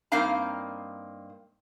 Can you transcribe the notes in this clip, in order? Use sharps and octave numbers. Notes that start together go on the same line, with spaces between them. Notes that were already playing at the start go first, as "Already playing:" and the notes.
G2 A#3 C4 D#4 F5 A#5